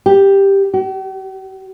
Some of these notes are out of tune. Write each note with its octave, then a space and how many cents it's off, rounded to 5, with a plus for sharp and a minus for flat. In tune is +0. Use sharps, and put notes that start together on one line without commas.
G4 +5
G4 -45